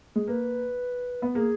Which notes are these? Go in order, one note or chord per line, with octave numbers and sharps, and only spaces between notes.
G#3
A#3 B4
B3
A#3 G#4